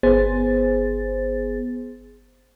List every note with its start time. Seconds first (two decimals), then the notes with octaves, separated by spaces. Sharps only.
0.03 G1 B3 G#4 C5 A6